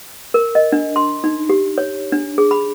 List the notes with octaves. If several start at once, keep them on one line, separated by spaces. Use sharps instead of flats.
A#4
D#5
D4
C6
D#4
G4
C#5
D4
G#4
B5